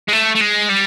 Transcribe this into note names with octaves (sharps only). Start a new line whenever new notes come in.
G#3
A3
A3
G#3
G3